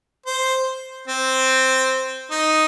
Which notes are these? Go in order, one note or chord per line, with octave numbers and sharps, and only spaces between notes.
C5
C4
D#4